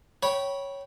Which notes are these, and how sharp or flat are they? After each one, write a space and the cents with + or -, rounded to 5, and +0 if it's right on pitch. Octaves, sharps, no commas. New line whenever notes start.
C#5 +0 G5 -20 B5 -20